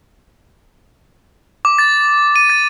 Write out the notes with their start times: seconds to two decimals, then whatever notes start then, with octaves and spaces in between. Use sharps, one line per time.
1.65 D6
1.79 A6
2.36 D#7
2.50 A6